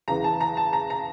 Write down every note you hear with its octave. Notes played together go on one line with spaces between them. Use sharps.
E2 C#3 E3 A#5
A5
A#5
A5
A#5
A#5